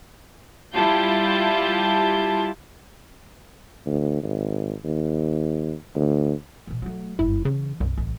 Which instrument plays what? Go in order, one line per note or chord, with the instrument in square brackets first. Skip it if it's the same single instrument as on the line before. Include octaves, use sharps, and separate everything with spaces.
[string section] G3 E4 F4 G4 A5 G6
[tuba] D2
G#1
D#2
D2
[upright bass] A#2 E3
F#3 A3
[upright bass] F#1 G2 [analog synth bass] E4
[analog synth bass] C#3 [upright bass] E3
[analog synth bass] C2 [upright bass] F#2
[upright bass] A1